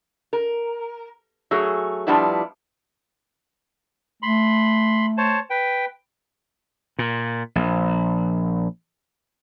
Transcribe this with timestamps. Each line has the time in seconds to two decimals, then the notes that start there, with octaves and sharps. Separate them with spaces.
0.33 A#4
1.51 F#3 A3 G#4
2.07 F3 G3 B3 D4 E4
4.22 A3 B5 C6
5.18 C5 C#5 A5
5.50 B4 G5
6.99 A#2
7.55 A#1